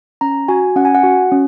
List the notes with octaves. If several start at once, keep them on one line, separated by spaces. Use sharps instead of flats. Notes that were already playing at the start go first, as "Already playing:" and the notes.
C#4 A#5
F#4 G#5
C#4 F#5
G#5
F#5
F#4
C#4